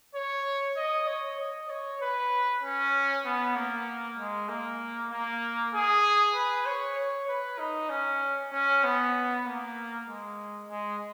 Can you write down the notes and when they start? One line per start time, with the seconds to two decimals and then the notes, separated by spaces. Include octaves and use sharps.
0.15 C#5
0.77 D#5
1.07 C#5
1.40 D#5
1.70 C#5
2.02 B4
2.63 C#4
3.25 B3
3.56 A#3
4.18 G#3
4.49 A#3
5.12 A#3
5.74 G#4
6.35 B4
6.66 C#5
6.98 C#5
7.29 B4
7.59 D#4
7.90 C#4
8.53 C#4
8.84 B3
9.45 A#3
10.08 G#3
10.70 G#3